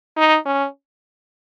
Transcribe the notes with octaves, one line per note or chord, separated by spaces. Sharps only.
D#4
C#4